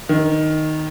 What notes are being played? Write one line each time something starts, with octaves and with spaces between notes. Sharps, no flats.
D#3